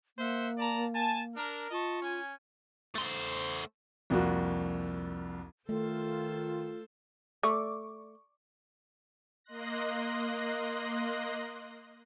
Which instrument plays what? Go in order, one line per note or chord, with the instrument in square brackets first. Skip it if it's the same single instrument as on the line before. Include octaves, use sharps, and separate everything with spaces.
[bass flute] A#3 [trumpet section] C5 E5 F#5
[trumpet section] D5 A5 A#5
G#5 A5
D4 A#4
[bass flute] F4 [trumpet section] D#5 A5 C#6
[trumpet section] C#4 G#5
[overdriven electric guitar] A3 C5
[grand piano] C2 F2 F3 A#3 F#4
[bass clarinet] D#3 [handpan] A3 [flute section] F4 [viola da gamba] A4 C5
[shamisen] A3 [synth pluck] D5 C#6 D6
[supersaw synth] A#3 D#5 C6 F#6 A#6